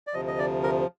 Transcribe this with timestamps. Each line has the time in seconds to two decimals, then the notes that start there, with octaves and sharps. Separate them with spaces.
0.07 D5
0.14 D2 C3 F3 D#5
0.27 D#5
0.38 D5
0.63 A#4